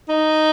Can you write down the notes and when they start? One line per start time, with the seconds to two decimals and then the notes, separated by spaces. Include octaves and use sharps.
0.09 D#4